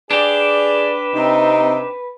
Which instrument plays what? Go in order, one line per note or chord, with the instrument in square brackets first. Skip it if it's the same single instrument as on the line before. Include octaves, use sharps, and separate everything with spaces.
[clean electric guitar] D4 G4 [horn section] G#4 D5 [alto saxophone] B4
[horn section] C3 C4 [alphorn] D#4